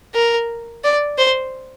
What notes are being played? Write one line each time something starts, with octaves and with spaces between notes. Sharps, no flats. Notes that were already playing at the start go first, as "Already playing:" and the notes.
A#4
D5
C5